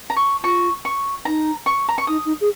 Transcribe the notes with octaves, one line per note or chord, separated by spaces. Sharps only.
A#5
C#6
F4 C#6
C#6
D#4 A#5
C#6
A#5
C#6
D#4 D#6
D#4
G#4